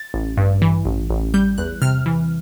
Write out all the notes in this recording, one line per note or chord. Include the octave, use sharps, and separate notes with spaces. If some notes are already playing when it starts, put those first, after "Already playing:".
Already playing: A6
A1
G2
E3
A1
A1
G3 G6
E2 F#6
C3 F6
E3